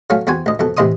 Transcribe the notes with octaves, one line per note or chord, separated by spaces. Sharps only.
F#3 A3 C#4 F5
E2 C4 F#4 G#5
D2 D#5
F2 B2 A4
A1 C3 E3 D#5 C6 D#6